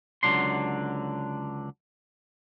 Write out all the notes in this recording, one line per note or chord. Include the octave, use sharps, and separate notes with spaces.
C#2 D3 F#3 D4 C6